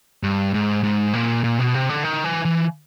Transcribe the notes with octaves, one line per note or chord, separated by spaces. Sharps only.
G2
G#2
G#2
A#2
A#2
B2
C3
D3
D#3
E3
E3